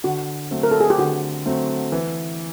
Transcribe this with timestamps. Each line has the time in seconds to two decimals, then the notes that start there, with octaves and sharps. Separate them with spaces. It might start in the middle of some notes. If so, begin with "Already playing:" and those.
0.04 D3 F#4
0.51 F#3 A3 C4
0.63 A#4
0.71 A4
0.81 G#4
0.90 G4
0.98 D3 F#4
1.46 F#3 A3 C4
1.92 E3